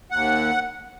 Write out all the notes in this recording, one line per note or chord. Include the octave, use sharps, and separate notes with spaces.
D#2 F#5